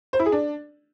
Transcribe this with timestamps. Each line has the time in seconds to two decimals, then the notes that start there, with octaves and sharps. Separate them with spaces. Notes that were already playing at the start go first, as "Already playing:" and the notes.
0.13 C5
0.19 E4
0.26 G#4
0.32 D4